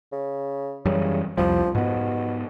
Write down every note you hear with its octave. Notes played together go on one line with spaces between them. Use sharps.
C#3
F#2 C#3 E3 G3
C2 F2 F3 G3
G#2 B2 B3